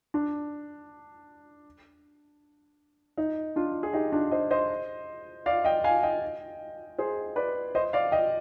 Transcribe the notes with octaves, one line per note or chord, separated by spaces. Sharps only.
D4
D#4
D4 F4
G#4
D#4 G4
D4 F4
C5 D#5
C5 D#5
D5 F5
D#5 G5
F5 G#5
D#5 G5
G#4 C5
B4 D5
C5 D#5
D5 F5
D#5 G5